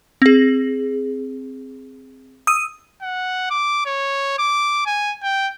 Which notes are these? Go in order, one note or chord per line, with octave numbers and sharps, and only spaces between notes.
C4 G#4
D#6 E6 D#7
F#5
D6
C#5
D6
G#5
G5